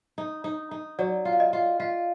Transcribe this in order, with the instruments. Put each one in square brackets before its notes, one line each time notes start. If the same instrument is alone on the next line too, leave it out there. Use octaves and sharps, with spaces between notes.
[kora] D#4
D#4
D#4
[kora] F#3 [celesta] D5
[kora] F4
[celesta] F5
D#5
[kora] F4
[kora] F4 [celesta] F5